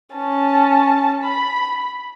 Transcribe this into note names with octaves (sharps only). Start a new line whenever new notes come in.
C#4 A5
B5